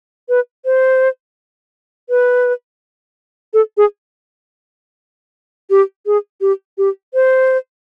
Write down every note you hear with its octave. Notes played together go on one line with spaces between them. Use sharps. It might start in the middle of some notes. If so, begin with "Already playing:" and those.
B4
C5
B4
A4
G#4
G4
G#4
G4
G4
C5